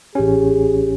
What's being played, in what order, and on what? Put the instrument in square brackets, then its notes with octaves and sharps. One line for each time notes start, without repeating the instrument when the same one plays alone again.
[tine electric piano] A1 C#4 [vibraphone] G4 [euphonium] G#4